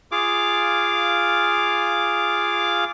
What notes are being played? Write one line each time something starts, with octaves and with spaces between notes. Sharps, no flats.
F4 G#4 F5 D6